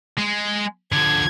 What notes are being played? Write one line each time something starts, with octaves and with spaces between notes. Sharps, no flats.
G#3
D3 F3 G#6